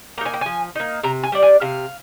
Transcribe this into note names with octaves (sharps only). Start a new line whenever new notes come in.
A#3 D#4 G#5 A#5
G5
F3 G#5
A#3 D#4
C3 A#5
G#5
G3 D4
G#5
C3 F5